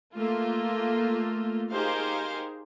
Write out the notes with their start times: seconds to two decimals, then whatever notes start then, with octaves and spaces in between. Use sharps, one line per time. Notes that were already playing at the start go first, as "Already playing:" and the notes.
0.15 A3 A#3 F4
1.72 D#4 G4 G#4 A#4 C5 F5